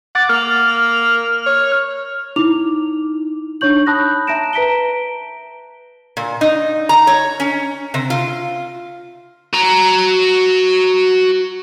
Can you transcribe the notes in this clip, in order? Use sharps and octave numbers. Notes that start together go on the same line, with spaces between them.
F#5 D6 A6
A#3 F6
C#5
D#4 E4 D6 F7
D4 D#4 C#5 C#6 G6 F#7
A5 B5 D#6 F#6 G6 A#6
E5 A5 A#5 A#6 D7 E7
B4 A#5 B6 D7 G7
A#2
D#4
A#5
C#5
C#4
C3
F4
F#4 A#5